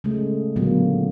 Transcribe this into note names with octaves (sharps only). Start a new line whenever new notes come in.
C#3 G#3 A3
A#2 D3 F#3 A#3 B3